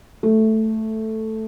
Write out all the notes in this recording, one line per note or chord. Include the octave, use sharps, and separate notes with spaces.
A3